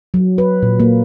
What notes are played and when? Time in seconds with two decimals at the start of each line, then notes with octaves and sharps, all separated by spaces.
0.14 F#3
0.38 B4
0.63 A#2
0.80 A#3